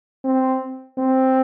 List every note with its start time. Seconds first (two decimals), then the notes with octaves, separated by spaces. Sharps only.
0.24 C4
0.98 C4